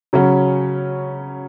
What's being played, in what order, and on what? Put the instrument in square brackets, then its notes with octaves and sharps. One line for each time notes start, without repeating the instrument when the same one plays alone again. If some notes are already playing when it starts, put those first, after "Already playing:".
[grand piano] C#3 F#3 C#4